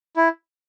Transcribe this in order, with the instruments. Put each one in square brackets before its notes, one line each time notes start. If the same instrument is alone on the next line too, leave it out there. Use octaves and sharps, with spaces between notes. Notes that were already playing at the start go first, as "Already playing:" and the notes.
[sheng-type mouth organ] E4